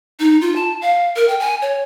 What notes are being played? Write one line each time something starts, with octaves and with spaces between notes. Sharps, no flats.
D#4
F4
A5
F5
A#4
G5
G#5
C#5